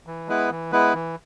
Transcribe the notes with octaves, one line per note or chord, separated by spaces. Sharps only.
E3
G#3 B3 E4 B4
E3
G#3 B3 E4 B4
E3